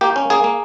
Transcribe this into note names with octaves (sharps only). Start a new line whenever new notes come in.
A#3 G4
C#4
A#3 G#4
A#3